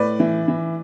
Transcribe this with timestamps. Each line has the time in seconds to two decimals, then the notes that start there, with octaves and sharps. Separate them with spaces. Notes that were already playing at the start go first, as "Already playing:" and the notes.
Already playing: A2 B4 D5
0.20 E3
0.48 E3